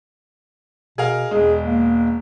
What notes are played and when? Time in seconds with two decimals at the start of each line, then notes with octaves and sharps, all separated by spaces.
0.98 B2 G#4 A#4 F5
1.31 E1 G#3 G#4
1.66 A#3